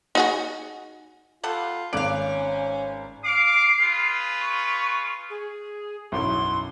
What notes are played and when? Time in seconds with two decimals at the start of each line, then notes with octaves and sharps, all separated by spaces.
0.15 D#4 F#4 G#4
1.43 G3 F4 A4 F#5
1.93 G#1 C#4 D5 F5 F#6 D7
3.24 F5 D6 C7
3.80 F4 G#4 B4
4.41 C#6
5.30 G#4
6.12 B1 F#2 E3 C6